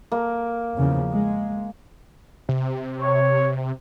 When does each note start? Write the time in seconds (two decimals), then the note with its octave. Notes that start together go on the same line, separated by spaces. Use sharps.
0.12 A#3
0.77 E2 C#3 F3
1.10 G#3
2.49 C3
3.00 C#5